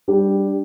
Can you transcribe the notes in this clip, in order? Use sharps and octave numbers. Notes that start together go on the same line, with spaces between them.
G3 D4 G4